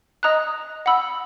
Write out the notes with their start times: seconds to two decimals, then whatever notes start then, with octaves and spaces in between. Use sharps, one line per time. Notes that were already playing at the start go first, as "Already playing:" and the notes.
0.23 D#5 A#5 D#6 F#6
0.86 F#5 B5 E6